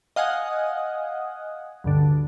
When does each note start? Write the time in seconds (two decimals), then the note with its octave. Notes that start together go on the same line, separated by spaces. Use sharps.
0.16 D#5 F5 F#5 G#5
1.84 D2 G2 D3